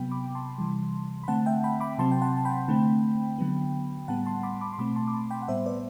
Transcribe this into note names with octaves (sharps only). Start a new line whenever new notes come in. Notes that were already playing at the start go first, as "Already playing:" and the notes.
Already playing: C3 F#3 B3 G5 B5
B5 D6
A5 C6
C3 E3 G3
B5
D3 A3 C4 F#5 A5
E5 G5
G5 B5
B5 D6
C3 F#3 C4 A5 C6
G5
F#5 A5
A5
G5 B5
D3 A3 C4
D3 F#3 B3
A2 G3 B3 F#5 A5
A5 C6
B5 D6
B5 D6
C6
B2 A3 C4 B5 D6
A5 C6
D6
A5 C6
G5 B5
F#5
A2 G3 B3 C5 E5
B4 D5